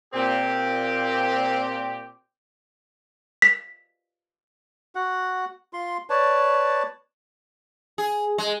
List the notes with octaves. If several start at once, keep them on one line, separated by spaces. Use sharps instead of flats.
A#2 C4 G4
B6
F#4 F#5
F4 C6
B4 C#5 D5 A5
G#4
G#3